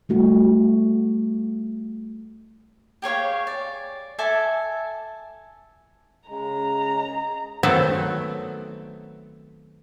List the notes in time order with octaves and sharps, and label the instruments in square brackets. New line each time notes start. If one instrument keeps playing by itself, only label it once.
[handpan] G3 A3 F#4
[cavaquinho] G4 G#4 C#5 F5
D5
A4 E5 G#5 D6
[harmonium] C#3 G#3 [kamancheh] A#5
[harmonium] G#4
[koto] D#3 F#3 A3 B3 C4 A4